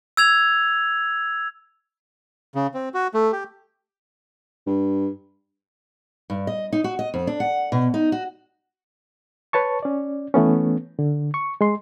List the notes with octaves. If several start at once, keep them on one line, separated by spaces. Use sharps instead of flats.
E6 G#6 F7
C#3
C4
F#4
A3
G4
G2
G2
D#5
D#4
F#4
D#5
F2
D4
F#5
B2
D#4
F#4
B4 C#5 A5 C#6
C#4 D5
E3 A3 B3 C#4
D3
C#6
G#3 C6